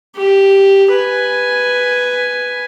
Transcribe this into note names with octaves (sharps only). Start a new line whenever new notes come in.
G4
B4 G#5